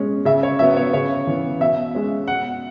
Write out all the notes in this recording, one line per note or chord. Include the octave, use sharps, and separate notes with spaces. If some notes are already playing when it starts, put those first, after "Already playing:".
Already playing: B2 G#3 C#4
C#3 E5
C#5
F#3 B3 E5
C#5
C#3 C#5
E3 B3
B2 E5
G#3 C#4
B2 F#5